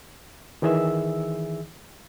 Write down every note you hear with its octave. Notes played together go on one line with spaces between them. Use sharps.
D#3 E3 G#4 E5 E6